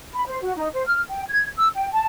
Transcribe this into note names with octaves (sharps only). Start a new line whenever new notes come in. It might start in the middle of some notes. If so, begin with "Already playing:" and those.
B5
C5
F#4
D#4
C5
F6
G5
G#6
E6
G5
A5